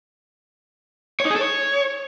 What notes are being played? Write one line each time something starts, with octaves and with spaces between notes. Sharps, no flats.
C#5
D#4
G#4
A4
C#5